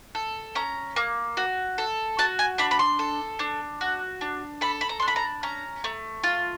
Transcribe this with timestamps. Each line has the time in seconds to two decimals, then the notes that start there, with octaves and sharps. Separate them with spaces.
0.15 A4
0.55 C#4 A#5
0.96 A#3
1.37 F#4
1.78 A4
2.19 F#4 A5
2.39 G#5
2.58 D4 B5
2.71 B5
2.79 C6
2.99 A4
3.39 D4
3.81 F#4
4.21 D4
4.61 A4 B5
4.81 B5
4.89 A#5
5.00 C6
5.02 D4
5.08 B5
5.16 A#5
5.43 C#4 A#5
5.84 A3
6.23 F4